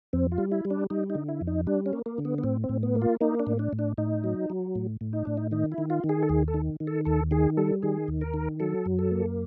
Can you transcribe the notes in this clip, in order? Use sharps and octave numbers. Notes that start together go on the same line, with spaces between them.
F2 C4
F4
G3
E4
G3
D4
G3 D#4
D#4
D3
E4
F2
D#4
G3 D4
C#4
A#3
A#3
D3
B3
B3
A2 C4
C4
A2
B3
A#3
F4
A#3 D#4
D4
A2
D4
A2
D4
A2 D#4
F#3
F#3
A2
A2
D#4
A2 D4
D#4
D#3 D#4
E4
D#3
F4
D#3
G#4
A4
D#2 G#4
A4
D#3
D#3
A4
D#2 A4
D#3 G#4
G3 A4
D#3 G#4
D#2
A#4
D#3
F#3 A4
F#2
A4
A#3